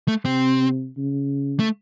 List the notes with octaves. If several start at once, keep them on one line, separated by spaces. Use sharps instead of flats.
A3
C3 C4
C#3
A3